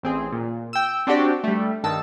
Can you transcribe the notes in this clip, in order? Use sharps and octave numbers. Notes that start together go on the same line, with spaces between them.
A1 C4 G#4
A#2
G5 E6
C4 D4 F#4 G4 D5
G3 A3
G2 D#3 A5 E6